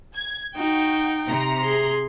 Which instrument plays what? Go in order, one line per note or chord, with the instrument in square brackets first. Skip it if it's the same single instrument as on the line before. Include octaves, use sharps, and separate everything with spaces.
[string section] G#6
[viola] D#4 G5 [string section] F#4
[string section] C3 A#5
[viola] G#4 C6